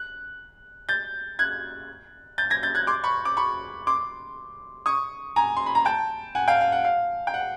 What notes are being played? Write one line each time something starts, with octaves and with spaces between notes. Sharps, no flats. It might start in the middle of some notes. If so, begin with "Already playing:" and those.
Already playing: F#6
G6 A6
F#6 G#6
G6 A6
G#6 A#6
G6 A6
F#6 G#6
C6 D6
B5 C#6
D6
B5 C#6
C6 D6
C#6 D#6
G#5 A#5
C6
B5
A#5
G5 A5
F#5 G#5
F5 G5
F5
F#5
F5
G5
F#5